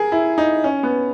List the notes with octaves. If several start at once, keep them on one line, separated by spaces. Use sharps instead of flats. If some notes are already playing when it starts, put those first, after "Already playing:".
Already playing: G#4 A#4
E4
D#4
C#4
B3